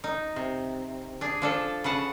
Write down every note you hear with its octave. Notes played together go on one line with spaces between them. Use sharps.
D#4
C3
D4 G#4
F3 D4 A4
C#3 B4 F#5 A5